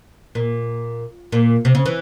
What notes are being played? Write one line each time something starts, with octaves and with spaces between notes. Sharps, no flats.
A#2
A#2
C3
C#3
E3